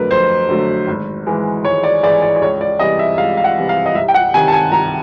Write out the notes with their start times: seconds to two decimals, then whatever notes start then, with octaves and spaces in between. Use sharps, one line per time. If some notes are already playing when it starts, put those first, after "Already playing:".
Already playing: F2 D3 F#3 A3 A#4 B4
0.10 F2 C5
0.49 D3 F#3 A3
0.87 G#1
1.26 G#2 E3 G#3
1.64 G#1 C#5
1.84 D5
2.03 G#2 E3 G#3 D5
2.22 D5
2.36 D5
2.42 C#2 C#5
2.61 D5
2.79 C3 E3 G3 D#5
2.99 E5
3.18 C#2 F5
3.37 F5
3.44 F#5
3.57 C3 E3 G3
3.69 F5
3.86 D#5
3.95 C2 E5
4.08 G5
4.14 F#5
4.34 C3 D#3 G#5
4.48 A5
4.52 G#5
4.72 C2 A#5